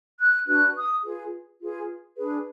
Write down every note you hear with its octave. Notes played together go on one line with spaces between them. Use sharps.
F#6
D4 F#4 B4 F#6
D#6
F4 G#4 B4
F4 G#4 B4
D4 G#4 B4